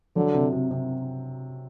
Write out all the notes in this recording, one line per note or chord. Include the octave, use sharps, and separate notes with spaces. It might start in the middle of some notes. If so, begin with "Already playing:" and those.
D3 F#3
C3
C3
C3